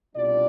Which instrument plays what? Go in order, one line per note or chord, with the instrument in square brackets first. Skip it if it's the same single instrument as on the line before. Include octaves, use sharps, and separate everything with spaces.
[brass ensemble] C2 B2 G3 D4 F4 D5